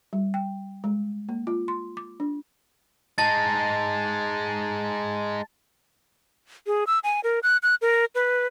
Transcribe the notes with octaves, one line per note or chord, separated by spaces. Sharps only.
G3
G5
G#3
A#3
F4
C6
D6
D4
G#3 D#4 A5 A6
G#4
E6
G#5
A#4
F#6
F#6
A#4
B4